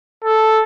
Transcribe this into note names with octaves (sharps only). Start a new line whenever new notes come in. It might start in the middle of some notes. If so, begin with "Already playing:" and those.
A4